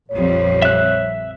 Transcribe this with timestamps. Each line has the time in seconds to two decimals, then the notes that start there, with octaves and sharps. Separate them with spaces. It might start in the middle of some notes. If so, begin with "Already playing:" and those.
0.11 A#1 F2 G3 C#5
0.62 E5 F#6